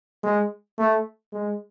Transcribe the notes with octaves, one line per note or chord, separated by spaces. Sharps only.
G#3
A3
G#3